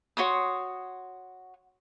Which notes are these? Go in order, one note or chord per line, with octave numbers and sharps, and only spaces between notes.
F#4 C#5 C6 D#6